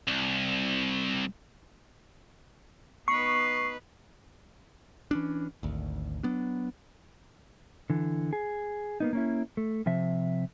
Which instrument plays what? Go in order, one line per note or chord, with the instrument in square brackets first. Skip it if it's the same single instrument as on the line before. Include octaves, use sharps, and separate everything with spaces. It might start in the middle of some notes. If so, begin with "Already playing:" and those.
[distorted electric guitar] C2
[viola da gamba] B3 D#4 B4 [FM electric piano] C#6 [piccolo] C7
[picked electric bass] E3 C#4 D4
G#1 D2
F#3 B3 D4
[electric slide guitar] D3 E3
G#4
A#3 B3 D#4
A#3 C#4 E4
A3
C3 F3 E5